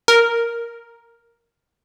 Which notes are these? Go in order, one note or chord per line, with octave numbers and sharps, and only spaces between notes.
A#4